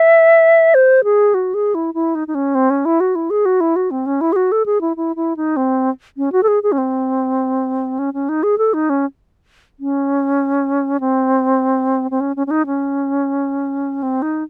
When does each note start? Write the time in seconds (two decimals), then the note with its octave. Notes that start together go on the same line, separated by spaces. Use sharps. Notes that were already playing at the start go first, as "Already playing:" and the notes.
Already playing: E5
0.74 C5
1.04 G#4
1.34 F#4
1.54 G#4
1.75 E4
1.94 E4
2.15 D#4
2.28 D#4
2.35 C#4
2.55 C4
2.70 C#4
2.85 E4
3.00 F#4
3.15 E4
3.30 G#4
3.45 F#4
3.61 E4
3.76 F#4
3.91 C4
4.06 C#4
4.21 E4
4.33 G#4
4.36 F#4
4.52 A4
4.66 G#4
4.81 E4
4.97 E4
5.16 E4
5.37 D#4
5.57 C4
6.17 C#4
6.32 F#4
6.43 A4
6.48 G#4
6.63 G#4
6.72 C#4
6.78 C4
7.99 C#4
8.14 C#4
8.29 D#4
8.43 G#4
8.58 A4
8.74 D#4
8.90 C#4
9.80 C#4
11.00 C4
12.11 C4
12.20 C#4
12.36 C#4
12.47 C#4
12.51 D#4
12.66 C#4
14.03 C4
14.22 D#4